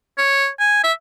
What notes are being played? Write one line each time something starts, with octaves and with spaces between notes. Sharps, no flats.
C#5
G#5
E5